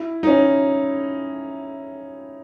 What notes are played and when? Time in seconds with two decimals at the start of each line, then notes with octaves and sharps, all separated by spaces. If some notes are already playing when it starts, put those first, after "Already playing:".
Already playing: E4
0.23 D#4
0.27 C#4